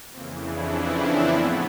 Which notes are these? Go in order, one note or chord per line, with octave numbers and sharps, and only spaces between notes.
F2 C#3 E3 A#3 C4
D4 E4
C4 D4
B3 C#4
A2 F3 A3 B3